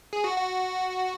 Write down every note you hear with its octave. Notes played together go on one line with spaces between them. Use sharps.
G#4
F#4
F#4